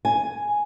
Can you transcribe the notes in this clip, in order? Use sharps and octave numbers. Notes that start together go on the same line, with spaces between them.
G#5